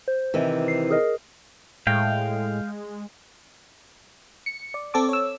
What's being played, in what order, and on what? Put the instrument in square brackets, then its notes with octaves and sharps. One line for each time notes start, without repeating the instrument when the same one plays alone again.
[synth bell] C5
[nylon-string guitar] C3 D#3 E3
[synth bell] C7
G#4 A#4 D#5
[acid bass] A2 [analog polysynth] G#3 [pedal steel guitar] F5 G5
[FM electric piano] C#7
D5
C4 A4 A5 D6
C#5 E6